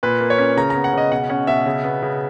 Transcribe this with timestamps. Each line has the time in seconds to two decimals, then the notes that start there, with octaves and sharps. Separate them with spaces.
0.03 A#2 B4
0.21 A#3
0.30 C#5
0.38 C#4
0.57 C#3 A#5
0.70 A#5
0.75 B3
0.84 F#5
0.93 C#3 D#5
1.12 B2 F#5
1.29 C#4 F#5
1.47 B2 E5
1.66 C#3
1.84 B3
2.02 C#3